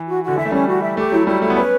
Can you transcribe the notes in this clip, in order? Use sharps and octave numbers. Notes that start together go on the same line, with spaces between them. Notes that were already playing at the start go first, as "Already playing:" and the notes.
Already playing: E3
F#4
D3 F#4
E3 E5
A3
G3 C#4
F#4
E5
A3 G4
F#3 E4
G3 E4
A3 E4
B3
C#4 B4